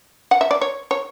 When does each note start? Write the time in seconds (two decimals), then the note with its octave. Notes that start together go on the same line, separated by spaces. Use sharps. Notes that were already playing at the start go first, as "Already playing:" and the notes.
0.31 F#5
0.41 E5
0.51 D5
0.61 C#5
0.91 C#5